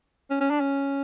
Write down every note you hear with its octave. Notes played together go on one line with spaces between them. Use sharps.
C#4
C#4
D4
C#4